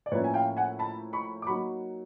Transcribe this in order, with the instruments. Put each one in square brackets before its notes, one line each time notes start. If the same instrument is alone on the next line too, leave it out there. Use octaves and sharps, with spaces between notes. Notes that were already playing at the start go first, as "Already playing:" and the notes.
[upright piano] D5
A2 F3 A#3 C#4 E4 B4 C#5
G#5
F5 G5
F#5 G#5
A5 B5
B5 C#6
D6
F#3 A#3 D#4 B5 C#6